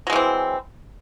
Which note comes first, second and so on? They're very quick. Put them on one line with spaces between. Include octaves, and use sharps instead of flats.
F#3 G#3 E3 C4